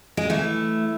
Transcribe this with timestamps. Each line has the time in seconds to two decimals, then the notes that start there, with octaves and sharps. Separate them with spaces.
0.17 G#3
0.30 E3 A3